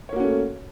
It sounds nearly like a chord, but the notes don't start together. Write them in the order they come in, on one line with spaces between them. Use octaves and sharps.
C#5 A#3 F#4 C#4 A3